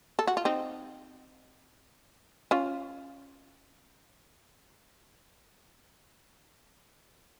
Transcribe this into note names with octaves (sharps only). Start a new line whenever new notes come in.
A4
F#4
F4
C4 D#4
C#4 F4